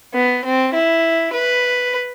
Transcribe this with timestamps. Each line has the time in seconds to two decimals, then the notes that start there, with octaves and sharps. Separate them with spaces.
0.15 B3
0.45 C4
0.74 E4
1.34 B4